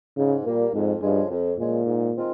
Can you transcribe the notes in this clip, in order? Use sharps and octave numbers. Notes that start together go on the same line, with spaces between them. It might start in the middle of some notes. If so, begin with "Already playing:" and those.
G#2 C#3
A#2 G3 A#3
F2 G#2
G2 C#3 F3 G#3
F2
A#2 C#3 F3 G#3
G#2
D#3 G#3 C4 F4